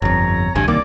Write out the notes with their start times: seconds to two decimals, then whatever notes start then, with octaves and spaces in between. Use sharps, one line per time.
0.02 G1 F2 C#5 A#5
0.55 A1 D2 G2 G#5
0.68 C2 D#3 A#3 D5 D6